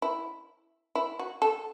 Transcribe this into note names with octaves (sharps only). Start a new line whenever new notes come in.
E4
E4
F#4
A4